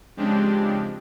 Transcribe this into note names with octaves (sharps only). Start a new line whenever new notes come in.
C#3 F3 G#3 C4 D4 G4